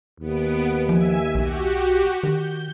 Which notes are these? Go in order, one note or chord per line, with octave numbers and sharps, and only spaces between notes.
D#2 B3 D7
F3 E5 G#5
B1 F#4 G4
D#3 G6